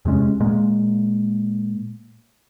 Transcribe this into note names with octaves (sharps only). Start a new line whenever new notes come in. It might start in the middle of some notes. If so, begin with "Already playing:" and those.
E2 C3 G#3 C#4
A#2 G#3 A#3